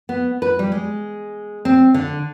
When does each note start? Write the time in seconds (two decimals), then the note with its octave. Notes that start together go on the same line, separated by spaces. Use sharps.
0.09 B3
0.42 B4
0.59 G3
0.72 G#3
1.65 C4
1.94 D3